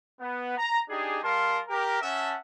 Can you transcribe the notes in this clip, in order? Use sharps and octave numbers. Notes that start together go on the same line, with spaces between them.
B3
A#5
D4 D#4 G4 G#4
G3 A#4 F5 A5 C6
G4 A#4
C#4 E5 F#5 A5